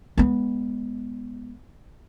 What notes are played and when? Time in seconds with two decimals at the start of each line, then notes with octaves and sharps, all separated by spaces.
0.18 G#3 B3